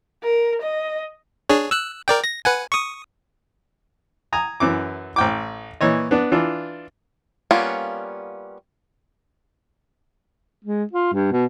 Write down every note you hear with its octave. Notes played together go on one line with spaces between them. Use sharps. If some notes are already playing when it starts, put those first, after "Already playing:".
A#4
D#5
D4 G#4 C#5
E6 F#6
A#4 D5 G5
A#6
B4 F#5 G#5
C#6 D#6
G#5 A#5 D#6
F#2 E3 D6
A1 G5 D6
A#2 E3 C#5 D#5
B3 D4
E3 D4 F4
G3 A#3 B3 C#4 F4
G#3
F4
G2
B2